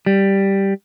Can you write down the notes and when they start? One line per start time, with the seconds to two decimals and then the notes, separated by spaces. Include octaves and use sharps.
0.06 G3